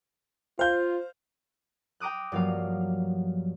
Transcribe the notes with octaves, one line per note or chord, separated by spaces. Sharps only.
F4 C5 F5 G6
G5 A#5 D6 D#6 F#6
G2 F3 F#3 A#3 F5